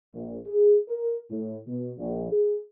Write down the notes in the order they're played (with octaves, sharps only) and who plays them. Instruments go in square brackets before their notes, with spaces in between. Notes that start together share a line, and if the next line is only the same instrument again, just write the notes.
[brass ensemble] A#1
G#4
A#4
A2
B2
A#1
G#4